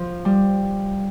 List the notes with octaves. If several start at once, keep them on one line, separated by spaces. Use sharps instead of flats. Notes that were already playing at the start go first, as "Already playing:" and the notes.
Already playing: F3
G3